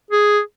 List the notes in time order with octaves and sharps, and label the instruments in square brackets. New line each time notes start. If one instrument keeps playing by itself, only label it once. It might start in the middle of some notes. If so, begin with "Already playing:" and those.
[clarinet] G#4